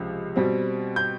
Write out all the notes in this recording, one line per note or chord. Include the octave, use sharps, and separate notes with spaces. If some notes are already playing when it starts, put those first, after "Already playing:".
Already playing: C#2 C3 F3
B2 G3 C4
G6